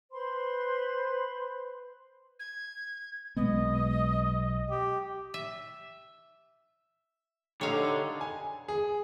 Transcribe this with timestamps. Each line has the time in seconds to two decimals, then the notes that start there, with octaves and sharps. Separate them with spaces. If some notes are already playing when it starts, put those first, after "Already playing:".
0.12 B4 C5 B5 C6
2.39 G#6
3.36 B1 G#3 B3 D#5
4.70 G4
5.34 E5
7.61 D3 G3 D#4 A4 C#5 F5
8.21 G#5
8.68 G#4